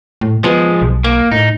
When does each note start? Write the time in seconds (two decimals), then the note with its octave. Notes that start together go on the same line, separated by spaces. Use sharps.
0.21 A2
0.44 F3 G#3 B3
0.82 B1
1.04 A#3
1.32 A2 D#4